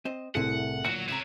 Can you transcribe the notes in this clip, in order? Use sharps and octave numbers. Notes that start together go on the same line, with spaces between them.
C4 C5 D#5
C2 A2 C4 E4 G#4 F#5
D2 A#2 F#3 F#4 F#6 C#7
C#2 C3 C#5 E5 A#5